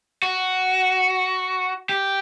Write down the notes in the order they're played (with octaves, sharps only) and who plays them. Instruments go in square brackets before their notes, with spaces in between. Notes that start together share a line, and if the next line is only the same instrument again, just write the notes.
[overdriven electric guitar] F#4
G4